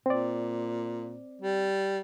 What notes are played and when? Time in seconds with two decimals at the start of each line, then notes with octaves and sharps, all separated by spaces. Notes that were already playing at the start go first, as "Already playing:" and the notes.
0.06 A#2 C4 D5
1.41 G3